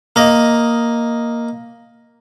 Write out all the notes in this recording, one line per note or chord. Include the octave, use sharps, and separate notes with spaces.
A#3 D#5